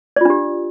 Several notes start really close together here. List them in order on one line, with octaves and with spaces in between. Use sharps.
D5 F4 D4 G4